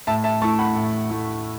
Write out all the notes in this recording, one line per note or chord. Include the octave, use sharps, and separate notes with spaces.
A2 E5 A5
E5 A5
A3 E4 A5 C#6
F#5 B5
A2
A3 E4